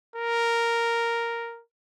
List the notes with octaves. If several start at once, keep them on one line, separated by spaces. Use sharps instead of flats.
A#4